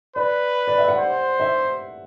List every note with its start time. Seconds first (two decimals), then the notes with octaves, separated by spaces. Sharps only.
0.16 B4 D5
0.68 D5
0.78 E5
0.88 F#5
0.98 C5
1.40 E5